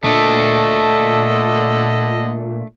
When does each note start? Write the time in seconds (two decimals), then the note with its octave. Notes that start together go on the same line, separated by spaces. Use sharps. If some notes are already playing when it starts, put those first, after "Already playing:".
0.04 A#2 D3 A3 D4 A4 D#5